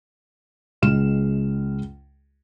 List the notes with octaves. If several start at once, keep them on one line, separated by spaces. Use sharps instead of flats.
C#2 G#3 F6 E7